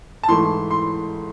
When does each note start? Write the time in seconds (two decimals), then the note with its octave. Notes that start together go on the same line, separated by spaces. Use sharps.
0.23 A5
0.28 G#2 E3 A3 C6
0.71 C6